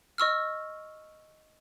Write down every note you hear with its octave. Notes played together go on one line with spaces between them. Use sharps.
D#5 C#6 E6 F6